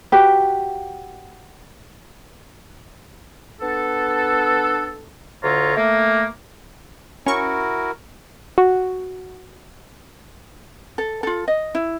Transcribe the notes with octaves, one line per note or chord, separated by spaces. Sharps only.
F#4 G4 B4
B3 D4 A4
D2 D3 F4 C#5 A#5
A3 A#3
C#4 E4 F#4 A#4 C#6
F#4
A4
F4 A4
D#5
E4